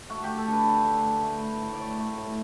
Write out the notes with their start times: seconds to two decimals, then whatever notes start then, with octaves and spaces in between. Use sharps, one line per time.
0.10 A3 F#4
0.24 A3 G4
0.38 A4
0.47 D3
0.52 B4
0.66 D3
0.85 A3
1.04 A3
1.23 A3
1.42 A2
1.61 A2
1.73 D5
1.80 A3 C#5
1.99 A3
2.17 A2